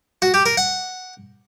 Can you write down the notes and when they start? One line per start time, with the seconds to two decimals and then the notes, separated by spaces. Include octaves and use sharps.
0.22 F#4
0.34 G4
0.46 A#4
0.57 F#5